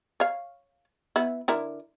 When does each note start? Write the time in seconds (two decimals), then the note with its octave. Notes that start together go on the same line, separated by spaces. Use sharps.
0.20 C#5 F5
1.16 B3 E4
1.48 D3 E4 A#4